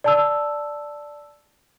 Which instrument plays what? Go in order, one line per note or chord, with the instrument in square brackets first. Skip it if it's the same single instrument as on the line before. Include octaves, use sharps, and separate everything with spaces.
[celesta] D5 A5 E6